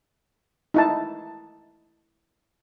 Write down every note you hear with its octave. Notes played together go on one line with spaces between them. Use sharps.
D#4 E4 A5